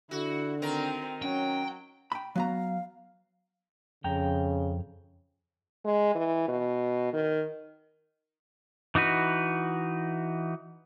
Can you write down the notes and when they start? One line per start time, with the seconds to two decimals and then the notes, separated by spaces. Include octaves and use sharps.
0.11 D3 E4 F#4
0.62 D#3 C4 A#4
1.22 F#3 C#4 G5
2.12 G5 B5
2.36 F#3 B3 F5 A#5
4.04 F2 C#3 G5 A#5
5.85 G#3
6.15 E3
6.48 B2
7.13 D#3
8.95 E3 D#4 F#4 B4